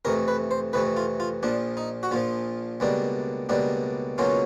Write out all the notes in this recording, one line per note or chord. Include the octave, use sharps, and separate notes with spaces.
F2 C3 E3 A3 A#4
B4
C5
F2 C3 E3 A3 B4
F4
F4
A#1 A#2 F3 D4
D#4
F#4
A#1 A#2 F3 F4
C#2 B2 G3 A#3 D4
C#2 B2 G3 A#3 D4
C#2 B2 F#3 A#3 C#4 F4